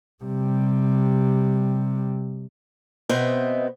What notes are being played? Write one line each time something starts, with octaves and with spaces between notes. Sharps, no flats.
C3 G3
B2 B3 C4 C5 D#5 E5